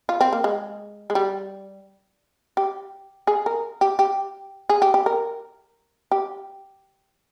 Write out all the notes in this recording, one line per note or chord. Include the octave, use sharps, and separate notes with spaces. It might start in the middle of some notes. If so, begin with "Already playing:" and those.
F4
C4
A#3
G#3
G#3
G3
G4
G#4
A#4
G4
G4
G#4
G4
G4
A#4
G4